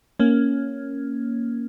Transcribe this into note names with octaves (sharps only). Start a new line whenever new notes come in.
A#3 C#4